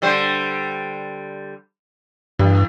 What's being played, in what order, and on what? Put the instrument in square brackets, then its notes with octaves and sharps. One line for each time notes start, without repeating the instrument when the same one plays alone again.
[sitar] D3 G3 C5
[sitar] E2 [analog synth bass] G2